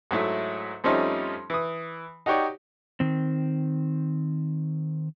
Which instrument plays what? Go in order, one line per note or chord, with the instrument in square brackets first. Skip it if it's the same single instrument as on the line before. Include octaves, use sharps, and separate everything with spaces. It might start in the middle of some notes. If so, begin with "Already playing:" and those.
[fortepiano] G#2 F#3 A3 E4
F2 F3 G3 A3 C#4 D#4
E3 D#6
D#4 F#4 G4 C#5 D5
[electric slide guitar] D#3 C4